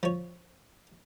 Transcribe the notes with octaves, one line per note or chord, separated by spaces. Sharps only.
F3 C#5